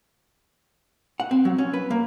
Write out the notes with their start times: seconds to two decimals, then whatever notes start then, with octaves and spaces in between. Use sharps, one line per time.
1.20 F#5
1.31 C4
1.45 F#3
1.58 C#4
1.73 B4
1.91 A#3